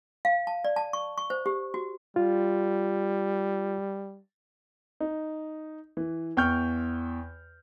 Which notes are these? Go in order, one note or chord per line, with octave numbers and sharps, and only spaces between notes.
F5
A5
D5
A5
C#6
C#6
C5
G4
F#4
G3 F4
D#4
E3
E2 G5 C#6 F6 G6